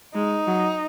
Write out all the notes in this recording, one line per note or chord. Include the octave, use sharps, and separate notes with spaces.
G#3 D#4
F#3